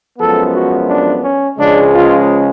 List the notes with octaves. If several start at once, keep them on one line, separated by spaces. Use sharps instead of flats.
F#2 F3 G#3 B3 A4
F#4
D4
C#4
C#2 C#3 F3 G#3 D4
F4